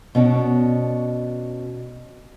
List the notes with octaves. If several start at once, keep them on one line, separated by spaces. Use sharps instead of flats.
B2 C#4 D4